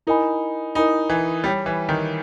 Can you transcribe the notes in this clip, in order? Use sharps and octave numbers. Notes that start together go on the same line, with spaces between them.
D#4 E4 A#4 D#5 G#5 B5
D#4 E4 A#4 D#5 G#5 B5
E3
G3 C#5 G5 B5
E3
D#3